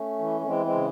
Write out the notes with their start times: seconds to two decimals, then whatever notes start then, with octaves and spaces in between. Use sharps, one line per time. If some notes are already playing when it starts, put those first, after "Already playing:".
Already playing: A3 C#4
0.19 E3
0.41 A3
0.46 E3 G#3 C4
0.65 G#3 C4
0.74 C#3